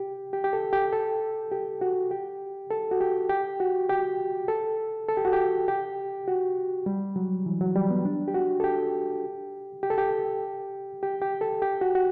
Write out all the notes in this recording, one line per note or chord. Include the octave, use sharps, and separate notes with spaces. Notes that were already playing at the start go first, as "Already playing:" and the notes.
Already playing: G4
G4
G4
A4
G4
A4
G4
F#4
G4
A4
F#4
G4
G4
F#4
G4
A4
A4
G4
F#4
G4
G4
F#4
G3
F#3
E3
F#3
G3
B3
D4
G4
F#4
A4
G4
G4
A4
G4
G4
G4
A4
G4
F#4
F#4